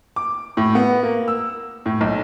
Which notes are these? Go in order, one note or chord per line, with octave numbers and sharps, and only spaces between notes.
D6
A2
B3
A#3
E6
A2
B1